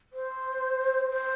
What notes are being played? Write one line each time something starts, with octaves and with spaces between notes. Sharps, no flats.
C5
C5